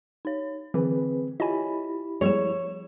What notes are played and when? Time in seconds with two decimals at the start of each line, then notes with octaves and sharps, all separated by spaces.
0.25 D#4 C#5
0.74 D3 E3 C4 G#4 B4
1.40 E4 F4 G4 C#5 D#5 G#5 B5
2.21 F3 G3 G#3 B3 G#4 C#5 E7